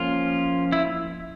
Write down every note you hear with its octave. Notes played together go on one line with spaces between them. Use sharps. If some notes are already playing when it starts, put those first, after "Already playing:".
Already playing: F3 A#3 C#4 F4
E4